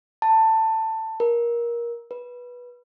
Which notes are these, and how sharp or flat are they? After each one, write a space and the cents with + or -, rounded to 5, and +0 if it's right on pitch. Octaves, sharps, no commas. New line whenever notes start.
A5 +15
A#4 +20
B4 -15